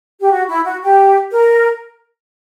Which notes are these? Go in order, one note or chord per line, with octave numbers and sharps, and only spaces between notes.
G4
F#4
E4
F#4
G4
A#4